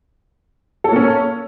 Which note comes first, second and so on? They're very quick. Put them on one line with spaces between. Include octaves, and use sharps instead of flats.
A4 C#5 A#3 C#4